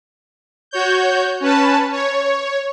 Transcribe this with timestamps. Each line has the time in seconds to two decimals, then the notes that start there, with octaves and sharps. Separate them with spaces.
0.71 F#4 C#5 G6
1.40 C#4 B4 A5
1.92 C#5